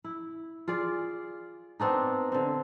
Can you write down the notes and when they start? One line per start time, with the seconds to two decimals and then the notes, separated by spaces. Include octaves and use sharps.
0.04 E4
0.68 F4 G#4 D5
1.80 B3 C4 D4 D#4
2.32 D3 C4